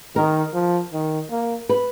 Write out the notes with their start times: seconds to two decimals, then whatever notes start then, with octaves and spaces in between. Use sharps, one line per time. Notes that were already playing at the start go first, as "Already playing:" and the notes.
0.16 D#3 A#4
0.54 F3
0.93 D#3
1.31 A#3
1.69 B4